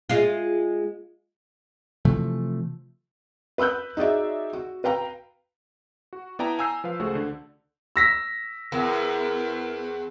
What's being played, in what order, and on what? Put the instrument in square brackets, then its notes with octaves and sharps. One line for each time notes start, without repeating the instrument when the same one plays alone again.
[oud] G#3 F4
[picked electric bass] C3 E3 F3 A3
[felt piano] B4 B5 E6 F#6 G6
D#4 F#4 G#4 D5 E5
F#4
B4 F5 G5 A#5
[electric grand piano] F#4
B3 E4 D5 G5 A5 A#5
F5 G#5 A#5 E6 G6 C7
F3 B4 F5
C#2 A3 F#4 G#4 C5
D3
[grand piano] E6 A#6 B6
[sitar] E2 [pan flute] A#4